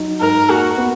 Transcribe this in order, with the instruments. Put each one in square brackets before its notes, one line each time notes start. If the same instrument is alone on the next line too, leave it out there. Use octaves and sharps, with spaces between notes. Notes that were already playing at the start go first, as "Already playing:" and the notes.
Already playing: [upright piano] F#3 D#4
[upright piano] G#2 [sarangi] A#4
[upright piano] A#3 [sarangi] F#4
[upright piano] B3